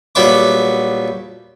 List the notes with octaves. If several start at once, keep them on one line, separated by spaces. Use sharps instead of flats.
A#1 F#3 G3 B3 E5 D6